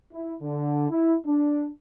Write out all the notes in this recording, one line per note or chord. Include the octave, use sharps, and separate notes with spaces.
E4
D3
E4
D4